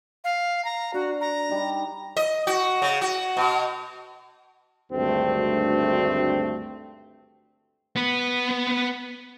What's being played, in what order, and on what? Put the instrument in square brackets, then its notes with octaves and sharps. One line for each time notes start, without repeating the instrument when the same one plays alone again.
[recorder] F5
A#5
[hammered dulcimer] D4 [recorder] F#4
[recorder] A#5
[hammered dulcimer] G3 D#4
[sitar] D#5
F#4
C#3
F#4
B2
[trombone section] G#1 D2 G2 A3 C4
[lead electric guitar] B3 B4